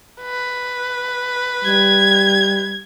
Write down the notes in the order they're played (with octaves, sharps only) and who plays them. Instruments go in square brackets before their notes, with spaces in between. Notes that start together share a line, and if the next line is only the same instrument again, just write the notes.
[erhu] B4
[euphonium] G3 [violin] G#6